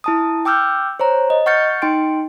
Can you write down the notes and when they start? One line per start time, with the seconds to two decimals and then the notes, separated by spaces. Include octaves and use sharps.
0.04 E4 A5 D#6
0.45 G5 D6 E6 F6 G6
1.00 C5 C#5 A#5
1.30 D#5
1.46 F#5 C#6 F6 G6 A6 C#7
1.82 D#4 G5 C6 D7